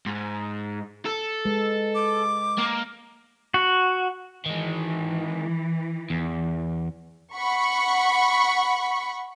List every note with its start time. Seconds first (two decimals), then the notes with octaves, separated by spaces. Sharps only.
0.06 G#2
1.06 A4
1.45 G#3 B4
1.95 D6
2.58 A#3
3.54 F#4
4.46 D#3 E3 G#3
6.10 E2
7.35 F#5 B5 C#6